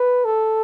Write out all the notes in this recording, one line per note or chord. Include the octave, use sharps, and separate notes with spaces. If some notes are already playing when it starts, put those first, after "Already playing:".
Already playing: B4
A4